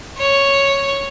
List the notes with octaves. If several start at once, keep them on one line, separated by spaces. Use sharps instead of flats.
C#5